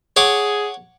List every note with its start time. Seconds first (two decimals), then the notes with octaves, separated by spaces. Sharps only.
0.16 G#4 C#5 F#5 D6